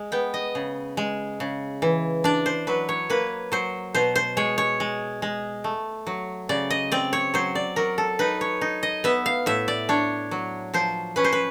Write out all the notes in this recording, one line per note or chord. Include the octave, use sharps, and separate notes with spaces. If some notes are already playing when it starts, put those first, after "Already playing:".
Already playing: G#3
B3 G5
D#5
C#3
G#3
C#3
E3
D4 D5
C5
F#3 B4
C#5
A#3 B4
F#3 C5
B2 C5
C5
G#3 C#5
C#5
G#3
G#3
A3
F#3
C#3 D5
D#5
C4 D5
C#5
F#3 C5
D5
F#3 A#4
A4
D#4 B4
C#5
D#4
D#5
B3 E5
F5
A2 E5
D5
D4 C#5
F#3
F3 C5
C#4 B4
C5
B4